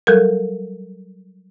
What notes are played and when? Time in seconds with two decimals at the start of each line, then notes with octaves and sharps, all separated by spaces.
0.07 F#3 G3 A4 A#4